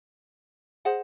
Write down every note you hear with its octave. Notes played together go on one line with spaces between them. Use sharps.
G#4 C5 D#5 F#5